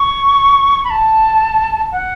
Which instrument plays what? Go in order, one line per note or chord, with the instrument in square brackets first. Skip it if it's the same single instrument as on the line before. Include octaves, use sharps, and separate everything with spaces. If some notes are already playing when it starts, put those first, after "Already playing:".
Already playing: [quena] C#6
B5
A5
F#5